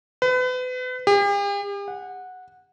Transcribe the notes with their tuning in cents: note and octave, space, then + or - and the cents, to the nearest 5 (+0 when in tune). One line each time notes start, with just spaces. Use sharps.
B4 +35
G4 +45
F#5 -10